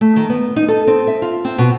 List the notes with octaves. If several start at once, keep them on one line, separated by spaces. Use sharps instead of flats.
A3
D#3
B3
D#4
A4
C4
E5
F4
C4
B2